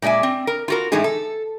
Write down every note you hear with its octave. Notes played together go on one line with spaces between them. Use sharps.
A#2 G#3 D5 E5 G#5
C4
A#4
F4 F#4 A#4
A2 E3 G#3 A3 D#4 G#4
A4